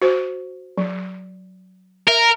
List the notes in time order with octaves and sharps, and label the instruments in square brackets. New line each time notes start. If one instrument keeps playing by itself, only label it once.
[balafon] F#4 C5
F#3
[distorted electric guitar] A#4 [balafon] E5